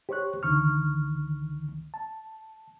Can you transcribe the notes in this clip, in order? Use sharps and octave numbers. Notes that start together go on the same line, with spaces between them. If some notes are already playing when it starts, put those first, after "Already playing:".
G4 C5 C#5 C#6 F#6
C#2 D3 D#3 C#6 F6
A5